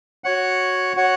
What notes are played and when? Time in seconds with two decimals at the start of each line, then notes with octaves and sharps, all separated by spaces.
0.24 F#4 C#5 F#5
0.96 F#4 C#5 F#5